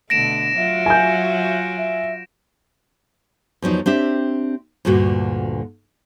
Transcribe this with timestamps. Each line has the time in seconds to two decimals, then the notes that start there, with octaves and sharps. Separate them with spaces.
0.10 B2 D3 A3 A#6 D7 E7
0.57 F#3 F4 F#4 E5
0.86 G#5 G6
1.78 E5
3.62 E2 F3 F#3 D#4
3.86 C4 D4 G4 E5
4.85 D2 G2 A#2 D3 F#4